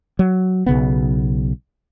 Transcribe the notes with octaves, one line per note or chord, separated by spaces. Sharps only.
F#3
B1 C#3 B3